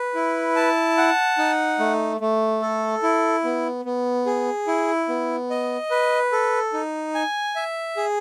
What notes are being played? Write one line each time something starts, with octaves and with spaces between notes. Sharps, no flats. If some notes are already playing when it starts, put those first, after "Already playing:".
Already playing: B4
E4
A5
F#5
D#4
A3
A3
A4
E4
B3
B3
G#4
E4
B3
D#5
B4
A4
D#4
G#5
E5
G#4